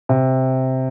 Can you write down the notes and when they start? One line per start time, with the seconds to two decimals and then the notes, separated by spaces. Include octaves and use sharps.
0.09 C3